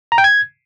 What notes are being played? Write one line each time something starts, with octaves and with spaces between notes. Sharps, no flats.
A#5
G5
G#6